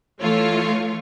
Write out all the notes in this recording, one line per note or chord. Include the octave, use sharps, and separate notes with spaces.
E3 A3 F4 C#5